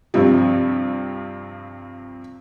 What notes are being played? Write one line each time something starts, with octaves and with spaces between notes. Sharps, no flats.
G2 C3 F3